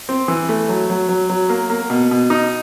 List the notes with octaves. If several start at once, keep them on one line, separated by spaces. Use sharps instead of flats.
C4
E3
A3
F#3
F#3
F#3
F#3
A#3
A#3
B2
B2
D#4